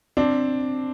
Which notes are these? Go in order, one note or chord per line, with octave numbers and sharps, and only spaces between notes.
C4 D4